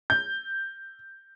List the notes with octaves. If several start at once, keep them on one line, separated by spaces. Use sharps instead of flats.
G6